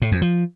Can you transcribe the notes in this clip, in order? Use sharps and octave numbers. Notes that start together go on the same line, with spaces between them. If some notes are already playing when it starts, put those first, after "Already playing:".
A2
F2
F3